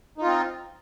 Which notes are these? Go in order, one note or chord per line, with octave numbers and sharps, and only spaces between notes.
C4 D#4 F4